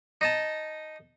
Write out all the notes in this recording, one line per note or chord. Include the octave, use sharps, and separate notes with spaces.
D#4 D#5 A5